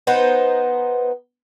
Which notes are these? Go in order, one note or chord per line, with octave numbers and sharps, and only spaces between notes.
B3 D#4 B4 C5